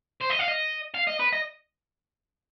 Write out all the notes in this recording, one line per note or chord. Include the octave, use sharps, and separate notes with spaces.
C5
D#5
F5
D#5
F5
D#5
B4
D#5